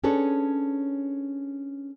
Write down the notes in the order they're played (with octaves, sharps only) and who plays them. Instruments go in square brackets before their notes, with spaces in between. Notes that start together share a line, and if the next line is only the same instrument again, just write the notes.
[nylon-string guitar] C#4 D4 G#4 A4 B4 C#5